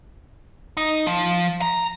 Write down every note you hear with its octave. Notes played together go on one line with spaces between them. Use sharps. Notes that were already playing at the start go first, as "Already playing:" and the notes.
D#4
F3
A#5